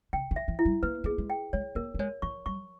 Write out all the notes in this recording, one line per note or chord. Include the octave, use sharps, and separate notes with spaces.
C#3 G5
D#3
E5
E3
E4
G3
A#3 B4
A#3 G#4
G#3
G5
G#3 C#5
A#3 A#4
A#3
G#3 C#5
E3 C#6
G3 C#6